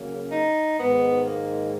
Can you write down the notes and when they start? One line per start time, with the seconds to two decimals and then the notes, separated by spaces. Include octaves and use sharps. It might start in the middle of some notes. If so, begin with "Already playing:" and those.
Already playing: C#3 F#3 A#3
0.32 D#4
0.78 G#2 D#3 G#3 B3
1.26 A#3